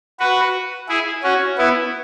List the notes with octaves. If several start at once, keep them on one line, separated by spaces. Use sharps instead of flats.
F#4 B4
E4 G#4
C#4 F#4
B3 E4